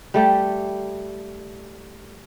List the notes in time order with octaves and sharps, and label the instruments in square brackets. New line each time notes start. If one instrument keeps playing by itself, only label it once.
[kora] G3 A3 G4